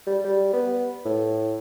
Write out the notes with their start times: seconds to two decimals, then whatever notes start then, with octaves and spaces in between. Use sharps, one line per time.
0.06 G3
0.24 G3
0.53 B3
1.05 A2